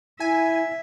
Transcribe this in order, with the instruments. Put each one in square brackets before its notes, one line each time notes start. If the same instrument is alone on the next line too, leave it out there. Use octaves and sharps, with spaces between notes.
[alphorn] E4 [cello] E5 [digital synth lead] G#5